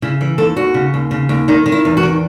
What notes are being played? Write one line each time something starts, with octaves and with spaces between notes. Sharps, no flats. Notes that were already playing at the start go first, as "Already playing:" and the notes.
C#3 E4
E3
D#2 A4
D#2 F#4
C#3
D#2
C#3
D#2
D#3 D#4
D#3
E4
E2
F#4
D#3